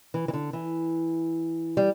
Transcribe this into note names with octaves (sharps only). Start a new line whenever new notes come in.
E3
E3
D3
E3
G3